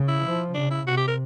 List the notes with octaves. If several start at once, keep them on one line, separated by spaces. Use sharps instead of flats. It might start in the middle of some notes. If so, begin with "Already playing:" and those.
Already playing: C#3
E4
F3
C#3 D4
E4
C3 F#4
G4
A#4